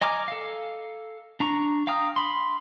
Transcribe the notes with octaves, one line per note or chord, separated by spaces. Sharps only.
D#5 G#5 A#5 D6 F6
A4 F5
D4 A#5 C#6
F5 G5 A#5 D#6 F6
B5 C6